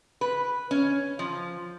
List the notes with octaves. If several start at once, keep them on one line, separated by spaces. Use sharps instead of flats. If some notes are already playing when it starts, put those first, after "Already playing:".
B4
C#4
F3